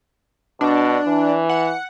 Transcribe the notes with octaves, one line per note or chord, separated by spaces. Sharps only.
B2 D4
E3
F#5